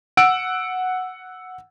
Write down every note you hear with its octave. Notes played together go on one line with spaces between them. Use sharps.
F#5 E6 D7